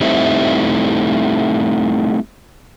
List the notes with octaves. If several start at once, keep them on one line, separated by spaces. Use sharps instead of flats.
G3 A3 C4 D#4 E4